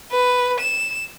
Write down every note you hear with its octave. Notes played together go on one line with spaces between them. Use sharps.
B4
E7